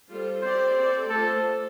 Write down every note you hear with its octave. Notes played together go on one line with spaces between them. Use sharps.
G3 F4 A4 C5
C4 G4 C5 D5
C4 A4 D5
A3 F4 A4 C5